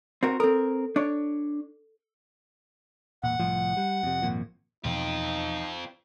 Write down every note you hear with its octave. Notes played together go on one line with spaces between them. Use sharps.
C4 F#4 A#4
C4 A4 A#4
D4 C#5
E1 A#2 F#5
C2 A2 F3
G3
F2 C3
G#1 F2 A#2
E2 B2 F3 C4 D#4 F4